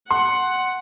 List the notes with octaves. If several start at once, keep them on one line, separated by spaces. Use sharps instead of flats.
F#5 C6